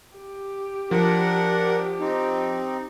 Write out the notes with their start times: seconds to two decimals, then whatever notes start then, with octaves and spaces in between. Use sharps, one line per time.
0.17 G4
0.91 F3 D4 A#4 F#5
2.00 C4 D#4